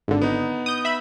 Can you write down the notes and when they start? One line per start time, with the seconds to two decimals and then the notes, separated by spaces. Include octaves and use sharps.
0.08 G#1 D3
0.22 B3 D#4
0.66 D#6 G6
0.85 E5 B5